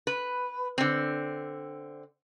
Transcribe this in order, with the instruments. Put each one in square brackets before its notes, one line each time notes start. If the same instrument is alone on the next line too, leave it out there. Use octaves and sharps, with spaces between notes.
[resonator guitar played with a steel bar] B4
D3 C4